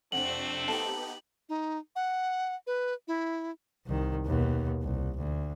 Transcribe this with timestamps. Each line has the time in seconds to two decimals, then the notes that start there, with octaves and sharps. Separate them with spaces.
0.12 F2 C3 A3 C4 D4 F#5 F#7
0.68 B3 D#4 G4 A4 F5 A5
1.49 D#4
1.96 F#5
2.67 B4
3.08 E4
3.86 C2 D#3
4.26 D#2 B2
4.83 C2
5.18 D2